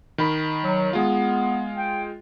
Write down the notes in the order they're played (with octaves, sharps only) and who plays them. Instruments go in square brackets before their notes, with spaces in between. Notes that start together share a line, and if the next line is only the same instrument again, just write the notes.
[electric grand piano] D#3 B5
[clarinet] F#3
[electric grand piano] G#3 F4 [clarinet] B3
[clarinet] G5